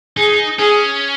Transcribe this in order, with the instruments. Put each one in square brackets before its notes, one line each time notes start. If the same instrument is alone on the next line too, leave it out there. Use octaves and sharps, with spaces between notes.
[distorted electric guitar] D#4 [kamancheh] G#4
[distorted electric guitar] C#4 [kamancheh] G#4